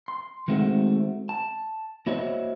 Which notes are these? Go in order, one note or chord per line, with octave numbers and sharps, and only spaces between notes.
C6
D#3 G#3 A3 C4 F#4
A5
A#3 E4 F#4 C5 C#5 D#5